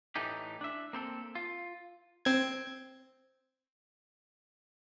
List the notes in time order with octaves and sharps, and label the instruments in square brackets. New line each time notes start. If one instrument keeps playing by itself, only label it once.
[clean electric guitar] A2 E3 A3 D#4 G4
D4 E5
A#3 C4 A4
F4
[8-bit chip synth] C4 G#6